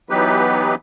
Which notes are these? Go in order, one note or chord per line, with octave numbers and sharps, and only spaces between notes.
E3 F#3 B3 D#4 G4 B4